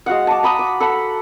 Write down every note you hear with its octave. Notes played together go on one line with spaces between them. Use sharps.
G#3 F#4 F5 F#5
A5 D6
A#5 B5 D#6
D6
A4 F#5 B5